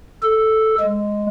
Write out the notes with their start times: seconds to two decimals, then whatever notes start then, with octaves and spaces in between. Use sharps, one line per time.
0.23 A4
0.80 G#3